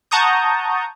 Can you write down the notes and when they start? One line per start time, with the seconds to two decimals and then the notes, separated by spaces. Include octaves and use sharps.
0.11 F#5 A5 A#5 C#6 D#6 G6